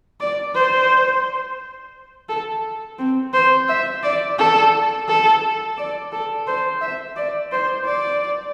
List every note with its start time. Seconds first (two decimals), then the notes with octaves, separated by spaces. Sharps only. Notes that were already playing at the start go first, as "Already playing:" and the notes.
0.20 D5
0.55 C5
2.29 A4
2.99 C4
3.34 C5
3.69 E5
4.03 D5
4.39 A4
5.08 A4
5.78 D5
6.12 A4
6.47 C5
6.81 E5
7.16 D5
7.52 C5
7.86 D5